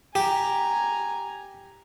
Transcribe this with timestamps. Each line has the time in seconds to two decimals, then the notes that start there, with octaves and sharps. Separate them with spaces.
0.15 G4 G#5 A#5